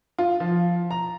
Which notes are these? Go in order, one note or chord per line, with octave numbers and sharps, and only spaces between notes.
F4
F3
A#5